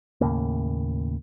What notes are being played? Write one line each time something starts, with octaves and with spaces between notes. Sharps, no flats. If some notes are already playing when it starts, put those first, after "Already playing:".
D#2 A2 C#3 A#3